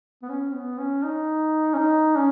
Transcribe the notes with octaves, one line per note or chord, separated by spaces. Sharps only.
B3
C#4
B3
C#4
D#4
C#4
D#4
C#4